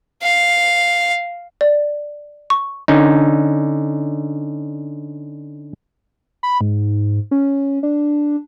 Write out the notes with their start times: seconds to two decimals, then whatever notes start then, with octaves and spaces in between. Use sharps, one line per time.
0.23 F5
1.61 D5
2.50 C#6
2.88 D3 C#4 D#4
6.43 B5
6.61 G#2
7.31 C#4
7.83 D4